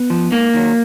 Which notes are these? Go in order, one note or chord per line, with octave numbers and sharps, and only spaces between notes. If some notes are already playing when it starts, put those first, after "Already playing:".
Already playing: B3
F3
G#2 A#3
D#3 F#3